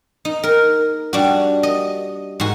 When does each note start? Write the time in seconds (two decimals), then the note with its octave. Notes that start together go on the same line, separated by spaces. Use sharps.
0.25 D#4
0.43 A#4
1.13 G3 D4 F#4
1.63 D#5
2.40 G#2 F#4